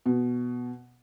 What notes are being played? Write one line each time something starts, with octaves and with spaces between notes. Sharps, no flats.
B2